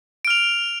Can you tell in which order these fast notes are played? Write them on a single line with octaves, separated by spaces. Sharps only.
D7 F6 F7